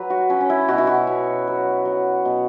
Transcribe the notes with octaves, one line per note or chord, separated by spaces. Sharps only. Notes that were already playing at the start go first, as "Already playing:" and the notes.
Already playing: F#3 B4
F#4
F#3 C#4
C#4
E4
B2 F#4
E4
F#4
B2
F#3
F#3
B2